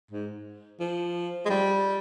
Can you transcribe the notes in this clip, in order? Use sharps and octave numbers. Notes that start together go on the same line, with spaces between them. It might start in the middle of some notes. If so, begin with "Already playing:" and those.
G#2
F3
G#3
G3